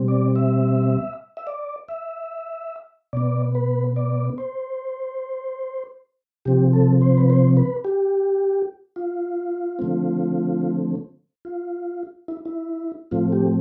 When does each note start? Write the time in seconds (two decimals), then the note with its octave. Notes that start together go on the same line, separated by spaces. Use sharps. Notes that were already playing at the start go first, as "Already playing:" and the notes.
Already playing: B2 G3 C4
0.08 D5
0.36 E5
1.37 E5
1.47 D5
1.88 E5
3.13 B2 B3 D5
3.55 B4
3.96 D5
4.38 C5
6.45 C3 F3 C4 G4
6.73 A4
7.02 C5
7.18 B4
7.30 C5
7.57 B4
7.85 G4
8.96 F4
9.79 D3 F3 A3 C4
11.45 F4
12.28 E4
12.45 E4
13.11 A2 F3 A3 C4 F4
13.33 G4